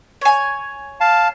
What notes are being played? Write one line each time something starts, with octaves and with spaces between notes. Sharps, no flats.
C#5 G#5
F5 A5